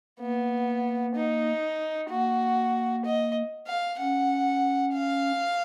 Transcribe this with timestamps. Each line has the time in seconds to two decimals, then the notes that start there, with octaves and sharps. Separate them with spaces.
0.20 A#3 B3
1.15 D#4
2.10 A#3 F#4
3.05 D#5
3.68 F5
3.99 C#4 F#5
4.94 F5